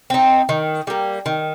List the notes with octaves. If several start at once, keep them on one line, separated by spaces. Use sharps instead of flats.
C4 D#4
D#3
G3 A#3
D#3